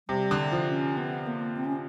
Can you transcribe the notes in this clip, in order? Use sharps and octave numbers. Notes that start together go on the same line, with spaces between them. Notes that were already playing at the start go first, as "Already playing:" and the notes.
C3 G3
D3
F3
C#4
B3
A#3
C4
C#4